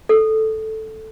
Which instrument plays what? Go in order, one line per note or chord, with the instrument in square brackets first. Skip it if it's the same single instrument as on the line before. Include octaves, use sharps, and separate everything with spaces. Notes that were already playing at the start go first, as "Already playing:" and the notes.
[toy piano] A4